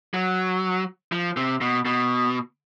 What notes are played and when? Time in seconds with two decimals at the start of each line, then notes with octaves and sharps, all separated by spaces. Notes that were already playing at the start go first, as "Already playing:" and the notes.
0.14 F#3
1.12 F3
1.37 C3
1.61 B2
1.85 B2